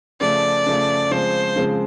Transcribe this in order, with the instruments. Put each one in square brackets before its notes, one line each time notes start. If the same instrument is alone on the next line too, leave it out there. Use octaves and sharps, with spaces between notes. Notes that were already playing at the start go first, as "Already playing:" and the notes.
[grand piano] C#3 F3 A3 [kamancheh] D5
[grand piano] C#3 F3 A3
[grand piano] C#3 F3 G#3 C4 [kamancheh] C5
[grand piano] C#3 F3 G#3 C4